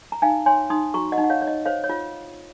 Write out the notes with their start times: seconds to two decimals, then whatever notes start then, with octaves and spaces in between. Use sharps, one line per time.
0.12 A#5
0.22 D#4 F5 G#5
0.46 C#5 G#5 C6
0.70 D#4 C6 D#6
0.94 F#4 A#5 C#6
1.12 D#5 F#5
1.18 D#4
1.24 F#5
1.30 C#5 F5
1.42 C#5
1.47 D#5
1.65 C5 C#5 F5
1.84 C#5
1.89 F4